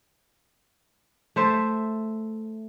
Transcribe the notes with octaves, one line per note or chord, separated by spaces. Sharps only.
A3 C5 E5